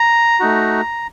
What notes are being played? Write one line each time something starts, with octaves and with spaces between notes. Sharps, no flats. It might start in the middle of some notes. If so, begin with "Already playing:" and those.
Already playing: A#5
A3 D#4 F#4